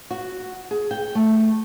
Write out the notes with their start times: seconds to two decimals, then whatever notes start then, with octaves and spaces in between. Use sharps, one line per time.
0.11 F#4
0.71 G#4
0.91 G5
1.15 A3